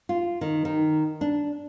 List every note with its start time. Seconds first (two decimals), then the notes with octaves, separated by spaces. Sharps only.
0.09 F4
0.41 D#3
0.65 D#3
1.21 D4